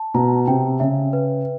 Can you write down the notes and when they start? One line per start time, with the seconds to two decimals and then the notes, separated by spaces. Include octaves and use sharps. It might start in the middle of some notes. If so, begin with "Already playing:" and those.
Already playing: A5
0.14 B2 A#5
0.47 C3 G5
0.80 C#3 E5
1.13 B4